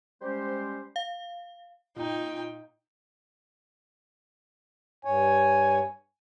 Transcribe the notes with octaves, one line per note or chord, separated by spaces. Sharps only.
G3 G#3 C#4 G4 C5
F5
A#2 D#4 G5
G2 C#5 G#5